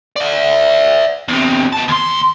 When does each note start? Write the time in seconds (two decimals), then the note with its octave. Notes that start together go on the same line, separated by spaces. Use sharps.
0.16 D5 E5
1.29 E2 C3
1.73 B3 A5
1.88 D#2 C6